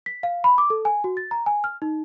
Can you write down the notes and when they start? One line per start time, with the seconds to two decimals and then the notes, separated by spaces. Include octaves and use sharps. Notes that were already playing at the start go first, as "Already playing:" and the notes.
0.06 B6
0.23 F5
0.44 B5
0.58 D6
0.70 A4
0.85 G#5
1.04 F#4
1.17 A6
1.31 A#5
1.46 G#5
1.64 F6
1.82 D#4